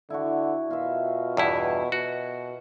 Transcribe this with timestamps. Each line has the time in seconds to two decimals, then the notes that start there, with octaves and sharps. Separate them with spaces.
0.10 D3 E4 F#4
0.71 B2 F4 A#4 E5
1.37 E2 G2 E4
1.92 B2 F#4